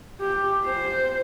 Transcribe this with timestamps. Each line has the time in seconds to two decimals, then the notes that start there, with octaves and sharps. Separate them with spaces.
0.21 G4
0.65 C5